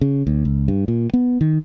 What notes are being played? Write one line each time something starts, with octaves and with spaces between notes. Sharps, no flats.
C#3
D2
C#2
G2
A#2
B3
D#3